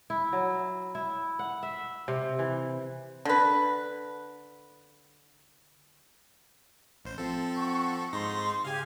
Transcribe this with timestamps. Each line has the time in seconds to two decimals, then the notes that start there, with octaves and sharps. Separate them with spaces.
0.10 E4
0.33 F#3
0.95 E4
1.39 F#5
1.63 E5
2.08 C3
2.39 E3
3.25 D3 B4
7.05 A1 C5
7.18 F3 C4 A4
7.57 F#5 C#6
8.13 G#2 D#4 C6 A#6
8.64 C#3 G4 G#4 F5 G#5